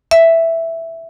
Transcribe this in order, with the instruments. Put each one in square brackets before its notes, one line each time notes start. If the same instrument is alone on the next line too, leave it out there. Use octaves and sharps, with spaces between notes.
[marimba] E5